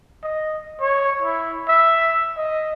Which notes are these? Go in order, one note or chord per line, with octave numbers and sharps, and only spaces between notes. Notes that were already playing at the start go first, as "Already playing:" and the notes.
D#5
C#5
E4
E5
D#5